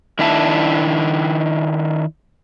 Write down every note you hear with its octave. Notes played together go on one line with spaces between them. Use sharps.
D#3 D4 E4 E5 A5